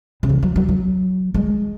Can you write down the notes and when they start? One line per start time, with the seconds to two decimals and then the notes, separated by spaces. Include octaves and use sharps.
0.23 C#3
0.29 E3
0.43 F#3
0.56 F#3
0.69 F#3
1.34 G#3